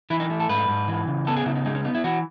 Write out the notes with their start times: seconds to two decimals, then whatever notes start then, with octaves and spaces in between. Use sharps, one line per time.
0.10 E3 E4
0.20 D#4
0.30 A3
0.40 A4
0.49 G#2 B4
0.68 G#2
0.88 E3
1.07 C#3
1.27 B3 A4
1.37 G#4
1.46 C#3 E4
1.55 D#4
1.65 G#3 D#4
1.75 C#4
1.85 B3 D#4
1.95 E4
2.04 E3 F#4